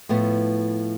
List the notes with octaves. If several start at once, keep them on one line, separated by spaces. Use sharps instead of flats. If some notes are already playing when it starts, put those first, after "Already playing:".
A2 F3 A3 B3